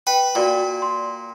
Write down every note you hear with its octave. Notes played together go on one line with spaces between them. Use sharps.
B4 G5
A#2 F#4 D5 G5
C6